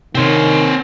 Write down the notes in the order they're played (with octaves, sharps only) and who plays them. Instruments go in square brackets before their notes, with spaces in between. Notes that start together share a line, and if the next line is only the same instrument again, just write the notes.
[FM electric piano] C3 C6 [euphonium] D#3 [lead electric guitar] C4 C#5